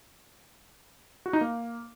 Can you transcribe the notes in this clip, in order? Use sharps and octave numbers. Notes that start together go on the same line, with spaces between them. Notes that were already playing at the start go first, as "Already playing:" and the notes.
F#4
D#4
A#3